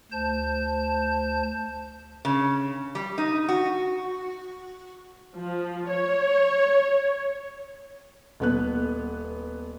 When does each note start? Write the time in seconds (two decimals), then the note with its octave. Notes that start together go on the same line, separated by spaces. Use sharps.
0.12 D2 C5 A5 G6
2.25 C#3
2.95 G3
3.18 D#4
3.49 F#4
5.37 F3
5.88 C#5
8.40 D#1 B3 F#6